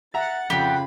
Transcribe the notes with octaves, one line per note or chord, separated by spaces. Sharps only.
E5 F#5 A#5 A6
F2 C#3 F4 G4 B5